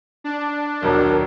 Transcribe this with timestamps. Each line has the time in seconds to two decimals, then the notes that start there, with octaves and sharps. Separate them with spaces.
0.24 D4
0.82 D#1 B1 A#4